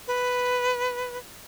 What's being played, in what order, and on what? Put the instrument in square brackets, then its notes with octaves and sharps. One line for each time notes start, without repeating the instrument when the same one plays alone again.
[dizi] B4